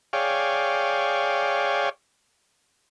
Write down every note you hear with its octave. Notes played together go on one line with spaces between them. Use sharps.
G#4 C#5 D5 F5 G5